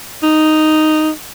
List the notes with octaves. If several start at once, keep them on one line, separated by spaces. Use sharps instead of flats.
D#4